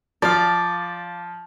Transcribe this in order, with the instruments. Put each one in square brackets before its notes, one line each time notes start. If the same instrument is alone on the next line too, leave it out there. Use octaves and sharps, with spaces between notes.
[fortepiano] F3 [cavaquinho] D5 F5